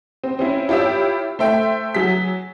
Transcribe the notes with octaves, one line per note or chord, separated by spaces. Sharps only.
C4
C4 C#4 E4
E4 F4 G4 C#5 E6
A3 C5 E5 G5
F#3 G#4 B6